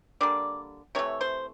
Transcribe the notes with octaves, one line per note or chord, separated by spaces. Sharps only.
D3 G3 A#3 D5
C3 E3 A3 C#5
C5